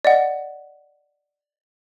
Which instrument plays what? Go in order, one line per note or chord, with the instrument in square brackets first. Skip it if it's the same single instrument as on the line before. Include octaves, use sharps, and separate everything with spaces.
[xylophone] D5 D#5 F#5